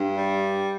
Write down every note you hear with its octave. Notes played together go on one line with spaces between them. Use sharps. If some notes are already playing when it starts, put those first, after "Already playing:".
Already playing: G2
G3